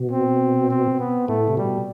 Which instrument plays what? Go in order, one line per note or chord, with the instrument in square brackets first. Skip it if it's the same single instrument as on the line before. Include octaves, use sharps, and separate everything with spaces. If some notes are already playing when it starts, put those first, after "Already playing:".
Already playing: [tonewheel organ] B2
[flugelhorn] C4
C4
B3
[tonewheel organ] A2 [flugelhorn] A3
[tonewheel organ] C3
[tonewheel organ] B2 [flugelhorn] G3